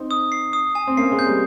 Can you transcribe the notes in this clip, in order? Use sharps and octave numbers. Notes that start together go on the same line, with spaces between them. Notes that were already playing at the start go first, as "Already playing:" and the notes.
Already playing: C4 D#4
D#6
C7
D#6
G#5
C4
A#3 C#4 C7
G#3 C4
G6
G3 A#3